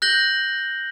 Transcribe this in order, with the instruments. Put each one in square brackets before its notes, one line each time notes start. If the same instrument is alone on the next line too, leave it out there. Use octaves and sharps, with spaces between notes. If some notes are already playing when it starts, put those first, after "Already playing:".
[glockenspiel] F#6 G6 A#6 F#7 G7